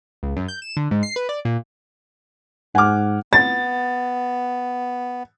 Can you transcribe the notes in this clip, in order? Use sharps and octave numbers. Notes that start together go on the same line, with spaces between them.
C#2
F#2
G6
E7
D3
G#2
C7
B4
D5
A#2
G#2 F#5 G#5 D6 F6
B3 A6